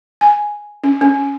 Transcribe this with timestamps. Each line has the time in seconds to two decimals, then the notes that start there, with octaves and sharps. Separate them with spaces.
0.21 G#5
0.84 C#4
1.01 C#4